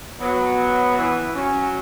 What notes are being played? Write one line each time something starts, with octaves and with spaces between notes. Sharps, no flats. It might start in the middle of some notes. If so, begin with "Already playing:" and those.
F#3 B3
E3
F#3 C#4